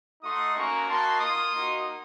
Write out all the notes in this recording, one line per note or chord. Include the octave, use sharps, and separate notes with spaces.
A3 D#4 F#4 C6 D#6
A#3 C#4 F#4 A#5 C#6
A#3 D#4 F#4 A5 C6
A#3 F4 C6 D#6
A#3 D#4 F#4